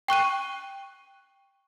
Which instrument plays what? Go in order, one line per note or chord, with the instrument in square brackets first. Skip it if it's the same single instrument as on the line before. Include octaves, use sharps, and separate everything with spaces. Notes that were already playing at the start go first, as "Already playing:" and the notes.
[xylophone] G5 C#6 F#6 D#7